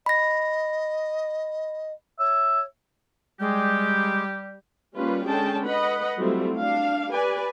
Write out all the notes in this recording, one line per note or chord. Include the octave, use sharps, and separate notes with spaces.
D#5 B5 A#6
C#5 E5
G3 G#3 G4
G3 A#3 C#4 F4 B4
D3 G#3 C#4 G#4 G5 A5
B4 D#5 F#5 B5
F#3 G3 A3 C4 E4 F4
D4 F5
G4 B4 D5 G#5